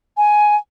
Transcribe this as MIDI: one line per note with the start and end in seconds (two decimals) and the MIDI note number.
0.17 0.56 80